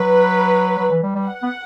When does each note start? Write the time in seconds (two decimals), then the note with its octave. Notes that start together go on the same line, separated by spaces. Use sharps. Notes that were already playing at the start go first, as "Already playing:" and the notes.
Already playing: F#3 B4
0.79 F#3
0.91 E3
1.03 G3
1.15 G3
1.26 F#5
1.43 B3